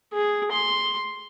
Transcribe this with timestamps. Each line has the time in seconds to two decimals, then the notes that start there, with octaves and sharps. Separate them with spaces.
0.13 G#4
0.51 C6